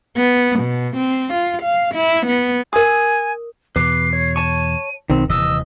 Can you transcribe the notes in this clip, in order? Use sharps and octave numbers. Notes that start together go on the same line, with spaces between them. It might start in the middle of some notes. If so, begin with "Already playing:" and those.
B3
B2
C4
F4
F5
E4
B3
A#4 G#5 D#6
E2 B2 B4 D6 C7
C#5
C#5 A5 C#6 D#7
B1 D#3 C4
D#1 C3 E3 D#5 E6